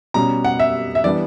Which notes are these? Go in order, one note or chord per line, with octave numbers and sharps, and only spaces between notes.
B2 G3 C#4 A#5
F#5
E5
E5
E3 G3 B3 D4 D5